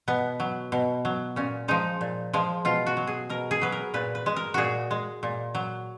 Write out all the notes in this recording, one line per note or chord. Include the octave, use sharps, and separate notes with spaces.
B2 B3
F#3
B2
F#3
A#2 C#4
F3 G#3 D#4
A#2
F3 G#3
B2 F4
F#4
F#3
G#4
B2 A#4
G#4
F#3 B4
A#4
A#2 B4
B4
G#3
A#4
A#2 F#4 G#4
G#3
A#2
F#3